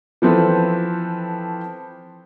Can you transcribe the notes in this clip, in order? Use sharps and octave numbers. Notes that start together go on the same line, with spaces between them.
E3 F3 C4 A4 B4